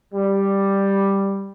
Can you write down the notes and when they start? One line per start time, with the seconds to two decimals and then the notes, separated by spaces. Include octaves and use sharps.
0.14 G3